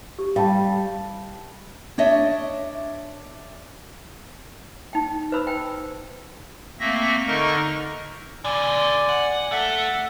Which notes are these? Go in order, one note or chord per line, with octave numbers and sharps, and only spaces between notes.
G4
G3 F5 A5
D4 C#5 D#5 E5
D#4 G5
B4 C5 B5 E6
G5
A3 A#3 C4 E5 A#6
D3 D#4 A#4 D#5 C#6
B2 D3 D5 G#5
F#5
A3 A4 E5 F#5